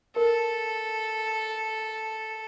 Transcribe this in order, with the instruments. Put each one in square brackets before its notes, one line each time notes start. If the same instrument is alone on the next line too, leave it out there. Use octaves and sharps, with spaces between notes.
[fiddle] A4 [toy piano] A#4